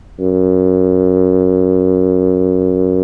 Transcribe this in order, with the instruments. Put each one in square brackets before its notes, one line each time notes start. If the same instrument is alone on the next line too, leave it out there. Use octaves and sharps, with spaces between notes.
[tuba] F#2